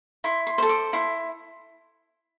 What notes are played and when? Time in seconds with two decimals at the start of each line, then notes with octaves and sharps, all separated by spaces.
0.24 E4 C6
0.47 C6
0.58 A4 C5
0.69 D6
0.93 E4 C6